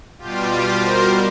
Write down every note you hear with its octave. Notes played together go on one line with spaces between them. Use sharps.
B2 G3 F4 G4
F4 G4
A#4 C5